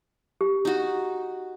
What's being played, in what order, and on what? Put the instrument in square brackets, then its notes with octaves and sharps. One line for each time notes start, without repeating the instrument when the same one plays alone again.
[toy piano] G4
[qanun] D#4 F#4